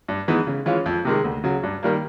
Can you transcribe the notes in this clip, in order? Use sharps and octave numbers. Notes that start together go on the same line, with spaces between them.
G2
E3 G#3 B3 D#4
C#3
E3 G#3 C#4 F4
F2
C3 D#3 G#3
D2
C#3 F#3
G2
D#3 G3 A#3